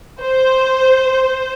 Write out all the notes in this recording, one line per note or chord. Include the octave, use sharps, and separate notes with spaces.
C5